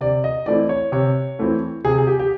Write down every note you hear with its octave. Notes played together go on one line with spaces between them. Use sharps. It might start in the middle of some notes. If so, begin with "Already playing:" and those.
C3 D5
D#5
E3 A3 C4 E4 D5
C#5
C3 C#5
E3 A3 C4 E4
C3 G#4
G#4
G4
G4